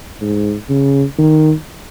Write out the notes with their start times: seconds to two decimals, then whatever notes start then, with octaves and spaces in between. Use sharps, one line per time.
0.21 G#2
0.69 C#3
1.18 D#3